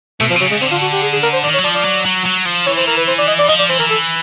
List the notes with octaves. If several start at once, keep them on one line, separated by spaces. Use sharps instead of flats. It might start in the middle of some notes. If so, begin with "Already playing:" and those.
B2 A3
F3
C3
C#3 F#3
G#3
D3 C4
F4
F#4
G4
G#4
G#4
A#4
C5
D#3 D5
C#5
F#3
F3 D5
D5
F#3
F#3
F#3
F3
E3 C#5
C5
A#4
B4
C5
D5
D#5
D5
F3 D#5
D5
E3 C5
A#4
A4